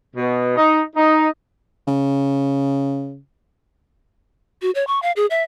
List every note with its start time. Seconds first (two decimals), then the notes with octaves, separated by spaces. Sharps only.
0.16 B2
0.57 D#4
0.96 D#4
1.87 C#3
4.62 F#4
4.75 C#5
4.87 C#6
5.02 F5
5.16 G#4
5.30 E5